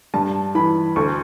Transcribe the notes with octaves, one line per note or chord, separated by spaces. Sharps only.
G2 A5
E3 B5
D2 C#6